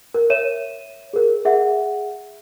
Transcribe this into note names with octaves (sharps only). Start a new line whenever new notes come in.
A#4
C#5 E5 D#7 E7
G#4 A#4
G#4 E5 F#5